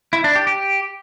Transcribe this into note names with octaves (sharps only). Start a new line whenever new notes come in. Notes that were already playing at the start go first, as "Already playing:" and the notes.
E4
D4
G4
G4